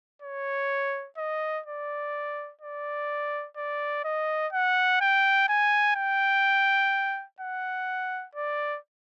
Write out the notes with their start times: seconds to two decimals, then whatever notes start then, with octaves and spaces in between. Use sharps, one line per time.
0.22 C#5
1.18 D#5
1.66 D5
2.61 D5
3.57 D5
4.04 D#5
4.53 F#5
5.01 G5
5.49 G#5
5.96 G5
7.40 F#5
8.35 D5